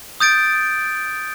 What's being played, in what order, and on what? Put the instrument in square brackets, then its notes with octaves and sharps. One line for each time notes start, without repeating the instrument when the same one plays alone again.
[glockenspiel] D#6 G6 A6 D7